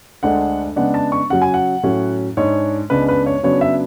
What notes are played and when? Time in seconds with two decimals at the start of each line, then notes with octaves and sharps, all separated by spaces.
0.23 D2 D3 G#3 D4 F#5
0.76 C#3 G#3 B3 D4 F#5
0.94 A5
1.12 C#6
1.30 C#3 F#3 C#4 F#5
1.42 G#5
1.54 F#5
1.83 A2 F#3 C#4
2.37 G#2 G#3 D4 C#5
2.90 C#2 C#3 G#3 B3 D4 B4
3.08 B4
3.26 C#5
3.43 C#3 F#3 B3 D4 C#5
3.61 E5